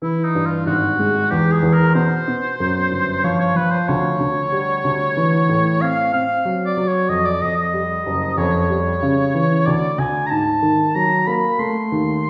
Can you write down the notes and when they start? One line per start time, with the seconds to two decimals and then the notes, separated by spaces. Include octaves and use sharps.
0.02 E3 E4
0.24 D#4
0.35 G2
0.46 F4
0.66 G#1 F#4
0.99 G#3
1.31 E2 G4
1.52 G#4
1.63 E2
1.74 A#4
1.95 B2 C5
2.28 B2
2.60 F#2
2.91 G1
3.24 F3 C#5
3.40 C#5
3.55 F3 B4
3.71 C5
3.88 D2 C#5
4.20 D2
4.52 G3
4.84 D2
5.17 E3
5.49 A2
5.81 C4 F5
6.13 C4 F5
6.45 F#3
6.66 D5
6.77 F#3
6.88 C#5
7.09 F2 D#5
7.26 D5
7.42 F2 D#5
7.57 D#5
7.74 G3
8.07 F#1
8.38 F2 C#5
8.70 G3
9.02 C#3
9.34 E3
9.66 D2 D5
9.98 D2 G#5
10.27 A#5
10.30 G#2 A5
10.62 D#3
10.95 F#3 A#5
11.27 A#3 B5
11.59 A3 C6
11.92 D#2